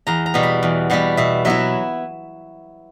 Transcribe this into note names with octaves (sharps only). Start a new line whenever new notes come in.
E2 A#5
A#5
B2 G3 B3
B5
E2
B2 G3 B3 F#5
B2 E5
F#3 B3 E4 E5